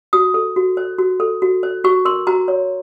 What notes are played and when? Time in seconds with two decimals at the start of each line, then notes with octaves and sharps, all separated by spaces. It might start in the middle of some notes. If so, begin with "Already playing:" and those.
0.13 F#4 D#6
0.34 A4
0.56 F#4
0.77 C5
0.99 F#4
1.20 A4
1.42 F#4
1.63 C5
1.84 F#4 C#6
2.05 A#4 C6
2.27 F#4 A#5
2.48 C#5